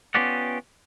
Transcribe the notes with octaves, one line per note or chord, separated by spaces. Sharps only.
B3 C#4 F4 G4 D5 F#5